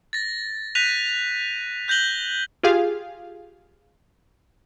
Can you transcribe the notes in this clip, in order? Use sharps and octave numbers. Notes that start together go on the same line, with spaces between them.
A6 A#6
F#6 G6 A#6 B6 D#7 F7
F#6 G6 A#6 F#7 G7
F4 G4 G#4 F5